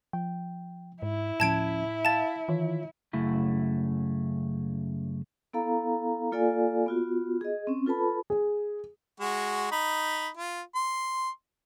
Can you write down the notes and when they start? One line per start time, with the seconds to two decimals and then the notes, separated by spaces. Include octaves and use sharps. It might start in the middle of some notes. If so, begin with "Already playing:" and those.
0.13 F3 G5
1.02 G#2 E4
1.40 D2 A2 F3 C#4 A5 G#6 D7
2.05 F5 A5 A6
2.49 D#3 E3 F4 C#5
3.13 F#2 C#3 A3 E4
5.53 B3 E4 A4 F5 A#5
6.32 A#3 F4 A4 D5 F5 G#5
6.86 B3 F4 F#4
7.41 G#4 D#5
7.67 C4 C#4
7.87 F4 A4 B4 A5 B5
8.30 G#4
9.20 G#3 F#4
9.72 D#4 B5
10.37 F4
10.75 C6